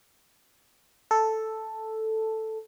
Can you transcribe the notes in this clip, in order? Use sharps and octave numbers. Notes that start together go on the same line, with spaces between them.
A4